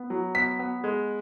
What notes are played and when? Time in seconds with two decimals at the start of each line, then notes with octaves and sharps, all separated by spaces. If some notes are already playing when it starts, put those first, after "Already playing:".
Already playing: B3
0.10 F#3
0.35 B3 B6
0.59 B3
0.84 G#3